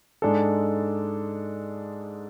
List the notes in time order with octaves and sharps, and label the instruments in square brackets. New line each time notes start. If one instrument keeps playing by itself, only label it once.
[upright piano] G#2 G#3 D4 A4